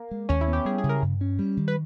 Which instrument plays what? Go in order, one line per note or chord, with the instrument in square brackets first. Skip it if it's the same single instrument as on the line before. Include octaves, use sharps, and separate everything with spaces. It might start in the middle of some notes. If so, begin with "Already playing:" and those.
Already playing: [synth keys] A#3
[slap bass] G#3
[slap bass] D#2 [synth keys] C#4
[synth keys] E4
[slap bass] B3
[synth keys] G4
[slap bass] G3 [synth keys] G#4
[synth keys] G#4
[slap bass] C#3
[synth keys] A#4
[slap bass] G2
C#4
G3
D#3
[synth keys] B4